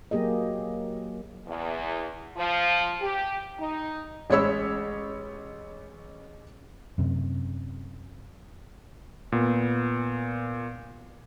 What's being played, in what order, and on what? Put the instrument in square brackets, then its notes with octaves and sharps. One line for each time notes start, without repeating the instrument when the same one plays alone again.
[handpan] F#3 A#3 G4 G#4 D#5
[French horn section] E2
F3
G4
D#4
[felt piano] A1 G#3 C#4 C#5 B5 E6
[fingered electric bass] F#2 C3
[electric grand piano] A#2 B3